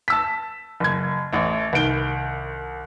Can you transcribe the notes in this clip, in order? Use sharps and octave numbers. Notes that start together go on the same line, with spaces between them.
A5 E6 B6
F#1 G#6
A1 A3
C2 D#3 D7 G7